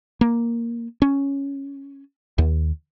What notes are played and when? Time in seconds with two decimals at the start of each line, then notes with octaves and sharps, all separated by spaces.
0.21 A#3
1.02 C#4
2.38 D#2